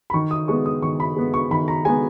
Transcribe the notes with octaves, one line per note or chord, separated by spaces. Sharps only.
B5
D#3 C#6
D#6
G#3 B3 C#6
D#6
D#3 C#6
B5
G#3 B3
C#6
D#3 B5
A#5
G#3 B3 G#5